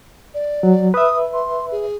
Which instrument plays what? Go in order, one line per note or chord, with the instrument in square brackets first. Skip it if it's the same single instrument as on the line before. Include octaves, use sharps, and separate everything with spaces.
[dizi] D5
[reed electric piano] F#3
[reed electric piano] B4 E5 [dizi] D#6
[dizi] C6
G#4